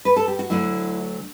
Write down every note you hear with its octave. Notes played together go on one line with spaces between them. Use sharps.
B4
A4
G4
F#4
D2 D3 F#3 A3 E4